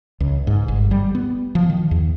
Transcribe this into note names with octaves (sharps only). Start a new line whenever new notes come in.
C#2
G#2
G1
G3
B3
F3
D#3
E2